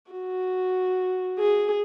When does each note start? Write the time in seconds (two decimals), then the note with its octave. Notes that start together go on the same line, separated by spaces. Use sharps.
0.11 F#4
1.39 G#4